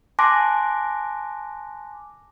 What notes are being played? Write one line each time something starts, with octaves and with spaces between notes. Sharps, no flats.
G#5 A5 C6 D6 F#6 A#6